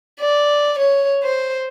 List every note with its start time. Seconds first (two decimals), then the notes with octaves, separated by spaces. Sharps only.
0.19 D5
0.79 C#5
1.24 C5